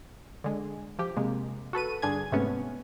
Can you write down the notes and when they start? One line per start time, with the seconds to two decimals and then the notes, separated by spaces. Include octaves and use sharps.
0.44 D3 G#3
0.99 F3 G4
1.17 C3 G#3 A#3
1.73 F#4 A4 B4 D#7
2.02 G2 D3 G#4 G#6
2.32 G#2 C3 A3 B3 C#4